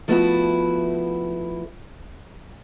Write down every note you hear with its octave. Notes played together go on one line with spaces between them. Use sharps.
F3 A3 B3 E4 F#4